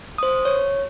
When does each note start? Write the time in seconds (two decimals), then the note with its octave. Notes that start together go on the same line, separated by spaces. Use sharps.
0.18 C5 D#6
0.45 C#5